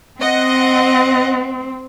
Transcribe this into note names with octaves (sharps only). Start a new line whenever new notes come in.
C4 D#5 F#5